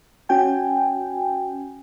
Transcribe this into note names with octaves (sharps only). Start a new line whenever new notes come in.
C#4 F#4 G5 G#5